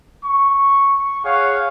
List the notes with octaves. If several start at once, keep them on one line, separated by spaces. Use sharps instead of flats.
C#6
G#4 C#5 F5 F#5